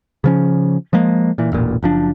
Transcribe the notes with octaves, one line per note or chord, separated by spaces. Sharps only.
C#3 F3 C#4
F3 G#3 A#3
A#2 E3
E1 A1 A#2
F#1 F3 D4